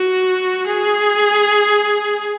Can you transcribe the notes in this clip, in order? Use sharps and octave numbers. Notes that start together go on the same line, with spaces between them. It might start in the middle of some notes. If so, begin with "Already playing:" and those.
Already playing: F#4
G#4